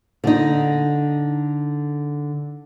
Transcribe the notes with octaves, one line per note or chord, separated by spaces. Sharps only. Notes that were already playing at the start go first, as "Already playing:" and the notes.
D3 D#4